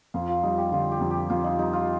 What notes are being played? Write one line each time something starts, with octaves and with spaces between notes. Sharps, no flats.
F2 F4
F4
G3 D#4
G4
D3 F4
G4
F2
G4
F2 F4
D#4
G3 D#4
F4